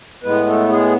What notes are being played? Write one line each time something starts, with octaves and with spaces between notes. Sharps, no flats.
A2 G#3 B3 B4
A3 A4
G#3 G#4